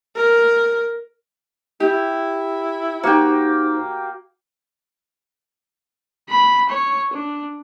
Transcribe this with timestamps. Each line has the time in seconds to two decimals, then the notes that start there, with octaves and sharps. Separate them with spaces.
0.16 A#4
1.80 E4 G4
3.03 A#3 D#4 F#4 G4 C5 G5
6.30 B5
6.69 C#5
7.13 D4